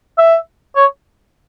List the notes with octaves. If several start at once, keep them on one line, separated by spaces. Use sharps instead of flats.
E5
C#5